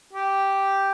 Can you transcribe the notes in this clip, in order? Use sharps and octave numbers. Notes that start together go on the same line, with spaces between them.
G4